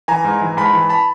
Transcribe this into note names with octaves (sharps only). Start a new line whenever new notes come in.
E3 G#5 A#5
G#2
E3
G#2 A5 B5
E3
A5 B5